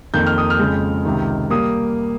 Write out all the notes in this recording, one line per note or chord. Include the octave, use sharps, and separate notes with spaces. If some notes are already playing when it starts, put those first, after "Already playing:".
F2 D#3 A#3 G6
F6
D#6
F6
F2 C#3 G#3
C#2 C3 D#3
G3 A#3 D#6